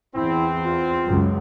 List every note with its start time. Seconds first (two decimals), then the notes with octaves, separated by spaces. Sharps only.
0.16 E2 C4 E4
0.64 F4
1.06 C#2 F#2